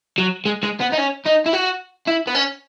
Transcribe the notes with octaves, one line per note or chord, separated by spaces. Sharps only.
F#3
G#3
G#3
B3
D#4
C#4
D#4
E4
F#4
E4
B3
C#4